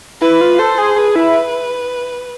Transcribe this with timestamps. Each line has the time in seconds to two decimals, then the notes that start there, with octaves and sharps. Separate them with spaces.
0.21 E4 B4
0.41 F4
0.59 A4 C5
0.78 G#4
0.96 G#4 B4
1.16 E4